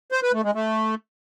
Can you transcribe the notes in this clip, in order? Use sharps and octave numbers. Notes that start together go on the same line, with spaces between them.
C5
B4
A3
G#3
A3